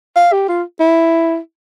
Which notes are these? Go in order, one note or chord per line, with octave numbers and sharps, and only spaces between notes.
F5
G4
F4
E4